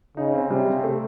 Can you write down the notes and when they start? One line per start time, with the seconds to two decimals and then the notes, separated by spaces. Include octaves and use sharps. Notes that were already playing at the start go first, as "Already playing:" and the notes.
0.17 C#3 D#4
0.34 C4
0.51 C3 G3
0.67 C4
0.83 A3